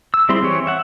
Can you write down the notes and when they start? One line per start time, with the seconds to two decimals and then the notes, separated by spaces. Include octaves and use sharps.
0.14 E6
0.29 G3 C4 E4 G#4 C6
0.42 E3 C4 C#5
0.67 E5 F#5